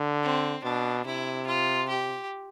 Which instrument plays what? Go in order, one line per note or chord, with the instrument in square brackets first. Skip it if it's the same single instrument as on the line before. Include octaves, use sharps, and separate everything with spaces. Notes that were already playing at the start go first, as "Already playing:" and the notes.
Already playing: [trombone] D3
[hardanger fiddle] C4
[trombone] B2 [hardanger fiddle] D4
[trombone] C3 [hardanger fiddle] E4
[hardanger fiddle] F4
G4